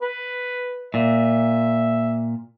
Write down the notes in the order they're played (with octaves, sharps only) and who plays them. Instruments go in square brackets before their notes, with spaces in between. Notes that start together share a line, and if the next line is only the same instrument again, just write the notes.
[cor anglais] B4
[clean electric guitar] A#2 [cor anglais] E5